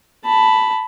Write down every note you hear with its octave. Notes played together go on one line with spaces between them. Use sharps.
A5 B5